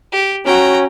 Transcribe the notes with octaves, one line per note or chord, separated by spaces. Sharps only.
G4
C#4 F#4 G5 A#5